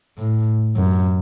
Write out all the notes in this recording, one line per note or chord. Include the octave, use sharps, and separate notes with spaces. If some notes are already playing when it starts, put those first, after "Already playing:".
A2
F#2